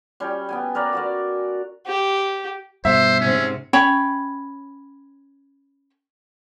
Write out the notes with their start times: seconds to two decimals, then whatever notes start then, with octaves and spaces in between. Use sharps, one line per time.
0.20 G3 C#4
0.49 B3 G5 G#5
0.75 A#4 B4 C#5 D5
0.93 F#4 A#4 D5
1.87 G4
2.85 G2 B2 C5 E5
3.20 G#2 C3 C#4
3.73 C#4 C#5 G5 B5